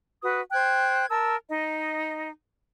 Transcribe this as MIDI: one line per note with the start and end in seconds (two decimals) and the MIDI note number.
0.24 0.42 66
0.24 0.42 71
0.24 0.42 87
0.52 1.06 72
0.52 1.06 79
0.52 1.06 90
0.52 1.06 92
1.10 1.35 70
1.10 1.35 81
1.10 1.35 88
1.49 2.29 63
1.49 2.29 75